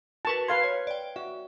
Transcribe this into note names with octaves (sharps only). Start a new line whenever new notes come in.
F#4 A#4 B4 A5 C#6
B4 F5 C6 G#6
C#5
D5 G5
F#4 E5